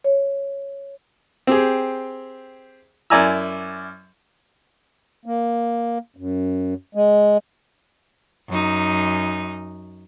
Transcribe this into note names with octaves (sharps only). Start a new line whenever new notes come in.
C#5
C4 G4 G#4
F#2 E4 D5 G#5 A#5 E6
A#3
F#2
G#3
F#2 D#4